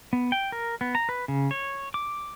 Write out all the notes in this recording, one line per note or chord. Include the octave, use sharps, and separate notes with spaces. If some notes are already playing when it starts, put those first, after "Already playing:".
B3
G5
A#4
B3
A#5
B4
C#3
C#5
D6